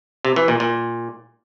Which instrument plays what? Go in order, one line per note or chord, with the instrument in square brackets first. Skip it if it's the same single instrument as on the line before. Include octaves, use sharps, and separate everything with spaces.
[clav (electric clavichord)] C3
E3
A#2
A#2